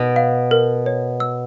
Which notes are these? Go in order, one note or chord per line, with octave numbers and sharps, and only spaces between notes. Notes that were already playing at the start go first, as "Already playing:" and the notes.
Already playing: B2
F5
A#4
C#5
E6